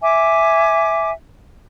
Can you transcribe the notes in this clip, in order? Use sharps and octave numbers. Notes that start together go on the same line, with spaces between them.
E5 G#5 D6